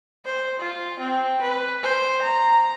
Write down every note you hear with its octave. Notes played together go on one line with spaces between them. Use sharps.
C5
F4
C4
B4
C5
A#5